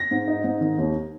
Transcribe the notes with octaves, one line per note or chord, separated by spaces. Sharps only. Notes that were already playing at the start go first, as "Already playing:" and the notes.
Already playing: A#6
G#2
D#4
G#2
D#3
D#2